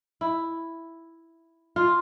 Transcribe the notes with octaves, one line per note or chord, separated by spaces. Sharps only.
E4
F4